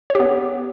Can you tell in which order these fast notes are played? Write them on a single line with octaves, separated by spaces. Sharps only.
C#5 G4 B3